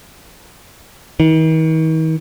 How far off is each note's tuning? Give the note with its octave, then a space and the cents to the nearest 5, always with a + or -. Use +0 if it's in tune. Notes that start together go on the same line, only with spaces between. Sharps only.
D#3 +45